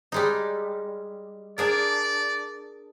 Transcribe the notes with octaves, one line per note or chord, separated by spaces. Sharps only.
G3 G#3 D#4
D4 G#4 A#4 D5